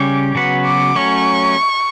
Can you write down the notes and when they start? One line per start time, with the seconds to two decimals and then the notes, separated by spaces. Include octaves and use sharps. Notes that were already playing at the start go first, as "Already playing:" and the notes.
Already playing: C#3 G3 C#4 G4 C#5 D6
0.35 C#3 F#3 B3 F#4 B4
0.66 D6
0.95 F#3 A3 C#4 C#6